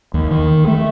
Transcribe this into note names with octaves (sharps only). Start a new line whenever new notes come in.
D#2
D#3
A3